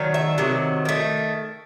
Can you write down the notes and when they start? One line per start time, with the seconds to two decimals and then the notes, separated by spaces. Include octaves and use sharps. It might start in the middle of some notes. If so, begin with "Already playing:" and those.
Already playing: D#3 F#3 A3
0.14 E5
0.38 C3 D#3 F#3
0.85 D#3 A3